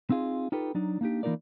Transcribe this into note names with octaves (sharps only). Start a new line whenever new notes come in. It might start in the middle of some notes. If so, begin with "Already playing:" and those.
C4 D#4 F4 G#4
D#4 F4 G4 A4 B4
F#3 D4 D#4
A#3 D4 D#4 G4
E3 A#3 D#4 F4 A#4 D5